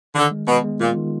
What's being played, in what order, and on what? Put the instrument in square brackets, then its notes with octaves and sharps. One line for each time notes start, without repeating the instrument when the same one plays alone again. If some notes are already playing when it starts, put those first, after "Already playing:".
[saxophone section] D3 [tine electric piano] D#3
[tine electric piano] G#3
[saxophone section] B2 [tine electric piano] B3
[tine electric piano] G#3
[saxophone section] A#2 [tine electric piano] F4
[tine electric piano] D#3